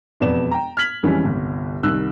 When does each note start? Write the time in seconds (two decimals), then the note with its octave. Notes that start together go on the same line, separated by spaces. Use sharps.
0.20 E1 F2 B3 B4 D5 E7
0.51 G5 A#5
0.77 F6 G#6 B6 F#7
1.03 F2 E3 G3 G#3 C#4
1.24 G1 C2
1.83 C2 D#3 G3 E6 F#6